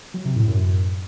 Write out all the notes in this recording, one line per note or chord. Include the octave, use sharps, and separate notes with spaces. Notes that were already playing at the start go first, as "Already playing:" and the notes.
F#3
C3
A2
F#2